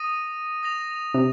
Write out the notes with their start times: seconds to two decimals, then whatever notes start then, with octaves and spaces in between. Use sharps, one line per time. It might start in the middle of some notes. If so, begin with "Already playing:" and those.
Already playing: D#6 A#6 D#7
0.63 D#6 A#6 F7
1.14 C3